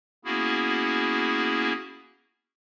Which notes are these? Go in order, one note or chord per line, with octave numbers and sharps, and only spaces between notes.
A#3 B3 C#4 E4 F#4 G#4